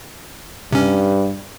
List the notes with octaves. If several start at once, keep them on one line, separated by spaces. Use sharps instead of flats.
G2 C3 C#4